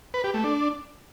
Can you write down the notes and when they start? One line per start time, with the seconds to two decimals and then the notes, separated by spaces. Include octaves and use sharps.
0.14 B4
0.24 G4
0.34 A3
0.44 D4